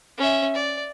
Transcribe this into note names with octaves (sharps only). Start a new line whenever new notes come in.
C#4 E5
D5